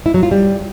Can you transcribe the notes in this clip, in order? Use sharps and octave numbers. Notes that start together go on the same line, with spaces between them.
E4
F#3
F4
G3